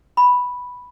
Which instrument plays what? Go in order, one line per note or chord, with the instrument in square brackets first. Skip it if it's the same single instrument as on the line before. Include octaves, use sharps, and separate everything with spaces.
[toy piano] B5